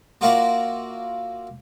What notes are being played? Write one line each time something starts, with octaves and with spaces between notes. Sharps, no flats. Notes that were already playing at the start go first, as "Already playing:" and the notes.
A#3 F4 F#4 A#4 D5 E5